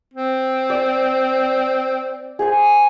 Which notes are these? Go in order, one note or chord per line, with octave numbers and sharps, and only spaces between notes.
C4
D5
G#4 C5 G#5